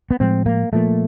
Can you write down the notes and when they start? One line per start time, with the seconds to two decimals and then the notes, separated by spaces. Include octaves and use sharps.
0.11 B3
0.20 A2 F3 G#3 C4
0.46 A#3
0.73 A#2 F3 A3 A#3